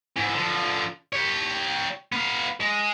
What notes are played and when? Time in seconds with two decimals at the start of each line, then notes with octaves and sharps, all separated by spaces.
0.17 G#2 E3
0.34 D3 F3
1.13 G4 C#5
2.12 B3 F5
2.60 G#3